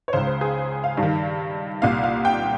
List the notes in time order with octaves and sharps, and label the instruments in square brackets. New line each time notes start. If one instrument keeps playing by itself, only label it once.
[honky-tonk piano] C#5
C#2 C#3 C5
C5
G#4
F5
G2
D#3
C2 A#2 F5
F5
G5